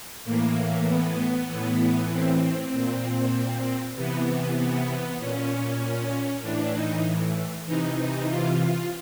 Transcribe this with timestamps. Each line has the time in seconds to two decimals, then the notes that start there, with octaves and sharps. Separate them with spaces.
0.25 A2 E3 A#3
0.87 B3
1.48 A2 E3 B3
2.10 C4
2.72 A#2
3.95 C3 E3 B3
4.58 B3
5.19 A#2 C#4
6.42 A2 E3 D4
6.73 D#4
7.66 C3 E3 D#4
7.97 D#4
8.28 F4